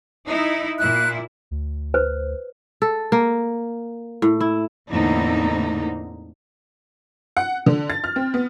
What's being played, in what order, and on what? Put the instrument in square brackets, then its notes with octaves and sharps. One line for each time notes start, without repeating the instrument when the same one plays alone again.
[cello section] D#4 E4
[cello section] A#2 E4 [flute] F#6
[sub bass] D2
[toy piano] B4 C5
[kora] A4
A#3
A2
E4
[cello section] E2 A2 D3 A#3 C4 D#4
[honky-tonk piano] F#5
D3
A6
F6
C4
B3